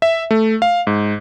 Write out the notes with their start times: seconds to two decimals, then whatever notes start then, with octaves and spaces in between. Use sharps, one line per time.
0.02 E5
0.31 A3
0.62 F5
0.87 G#2